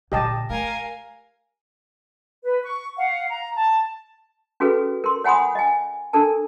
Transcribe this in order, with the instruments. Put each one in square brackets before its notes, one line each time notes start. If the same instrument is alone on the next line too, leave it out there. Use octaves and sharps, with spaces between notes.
[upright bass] A#2 D3 [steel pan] G4 D#5 A5
[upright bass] A3 [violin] A#4 G#5 [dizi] F5
[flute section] B4
C#6
F5 F#5
A#5
A5
[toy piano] C#4 F#4 G#4 A4 B4
A#4 C6
C#5 F#5 G#5 B5 C6 D#6
D#5 G#5
D4 A4 A#4 A5